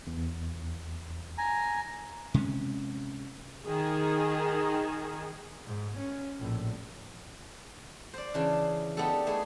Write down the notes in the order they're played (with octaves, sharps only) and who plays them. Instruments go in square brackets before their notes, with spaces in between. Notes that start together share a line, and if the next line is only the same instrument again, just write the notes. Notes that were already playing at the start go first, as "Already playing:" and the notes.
[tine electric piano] E2
[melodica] G#5 A#5
[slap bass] C3 G#3 C#4
[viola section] D#3 G#4
[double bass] G#2
C#4
A#1 A2
[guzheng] C5 D5
C#3 E3 D4
B3 D4 D#4 G4 A4
A3 E4 G#4